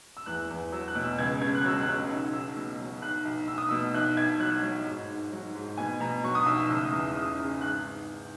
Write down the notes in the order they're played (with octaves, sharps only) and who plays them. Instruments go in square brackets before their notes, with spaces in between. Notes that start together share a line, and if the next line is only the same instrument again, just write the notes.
[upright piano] E6
E2 F#6
E2
F#3 E6
F#6
B2
E6
C#2 G#6
C#3 G#6
F#6
F#3 E6
F#6
C#3
B1 E6
B1 E6
B2
F#3
B1 F#6
B1
B1 E6
D#6
B2 E6
B1 F#6
B1 G#6
F#3 F#6
F#3
G#2
G#2
F#3
G#2
B2 G#5
B2 A#5
F#3 C#6
D#6
B1 E6
E6
F#1 E6
D#6
E2
E6
C#3 D#6
C#3
G#1 F#6